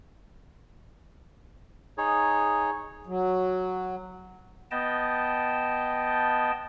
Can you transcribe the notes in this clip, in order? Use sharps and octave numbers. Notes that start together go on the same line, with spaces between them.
D#4 G#4 C#5
F#3
B3 D#5 G5 A5